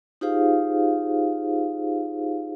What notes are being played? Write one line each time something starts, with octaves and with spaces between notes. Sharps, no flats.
D#4 F4 G4 G#4 C5 F5